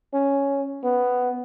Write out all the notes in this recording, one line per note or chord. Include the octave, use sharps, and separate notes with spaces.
C#4
B3